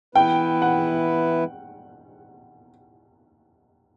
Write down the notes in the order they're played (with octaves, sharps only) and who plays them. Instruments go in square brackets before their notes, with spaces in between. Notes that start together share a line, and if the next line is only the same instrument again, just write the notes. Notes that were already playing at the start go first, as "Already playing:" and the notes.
[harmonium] E3 B3 E4 B4 [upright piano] G5
[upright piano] F#5